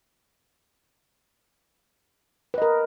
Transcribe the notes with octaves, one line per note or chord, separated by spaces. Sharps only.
A#4 B4 D#5